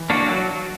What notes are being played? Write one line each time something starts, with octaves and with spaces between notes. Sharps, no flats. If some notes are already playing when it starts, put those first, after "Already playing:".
Already playing: E3
A#3 D4 F#4
F#3